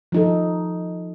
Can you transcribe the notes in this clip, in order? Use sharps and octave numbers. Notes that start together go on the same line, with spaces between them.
F3 D#4 A4